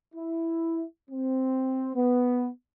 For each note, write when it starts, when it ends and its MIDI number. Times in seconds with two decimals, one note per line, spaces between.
0.15 0.84 64
1.10 1.92 60
1.95 2.49 59